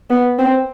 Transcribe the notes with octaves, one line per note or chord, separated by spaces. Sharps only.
B3
C4